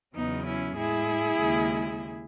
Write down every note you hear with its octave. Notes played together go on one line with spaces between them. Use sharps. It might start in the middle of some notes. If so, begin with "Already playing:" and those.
E2 C#3 F#3 B3 D#4
C#4 E4
A2 G#3 E4 G#4
D#2 C#3 G#3